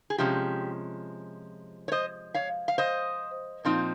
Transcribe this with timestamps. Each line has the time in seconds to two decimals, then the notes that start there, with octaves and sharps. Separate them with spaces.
0.10 G#4
0.18 C3 F3 G#3 C#4 G4
1.88 C#5
1.92 C5 D#5
2.34 C#5 F5
2.68 F5
2.78 C5 D#5
3.65 A#2 F3 C4 D#4